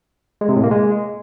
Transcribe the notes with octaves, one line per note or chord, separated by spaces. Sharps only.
G#3
C3
A2
A#3
G#3